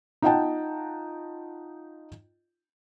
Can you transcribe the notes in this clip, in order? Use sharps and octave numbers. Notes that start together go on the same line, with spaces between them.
D#4 F4 D#5 F#5 G5 A5